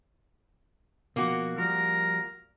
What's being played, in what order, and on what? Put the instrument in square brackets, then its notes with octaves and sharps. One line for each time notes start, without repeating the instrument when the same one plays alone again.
[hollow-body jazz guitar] B2 F3 [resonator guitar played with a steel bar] A#3 F#4
[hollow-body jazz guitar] F3 G3 [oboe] A#4